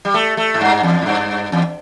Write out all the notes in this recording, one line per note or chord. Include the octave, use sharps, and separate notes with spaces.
G3
A3
A3
A2
G2
E2
A2
G2
E2